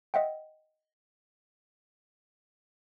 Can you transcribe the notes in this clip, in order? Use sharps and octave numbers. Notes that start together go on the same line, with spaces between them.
D#5 E5 F#5 G5